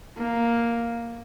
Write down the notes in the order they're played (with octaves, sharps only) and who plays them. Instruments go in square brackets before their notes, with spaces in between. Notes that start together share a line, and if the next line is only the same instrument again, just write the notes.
[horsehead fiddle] A#3